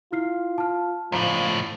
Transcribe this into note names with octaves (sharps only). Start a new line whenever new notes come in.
E4 F4 F6 C7
A5 F6
C#2 A2 F3 F5 A#5